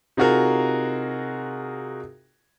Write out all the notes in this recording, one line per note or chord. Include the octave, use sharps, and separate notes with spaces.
C3 D#4 F4 F#4 G#4 A#4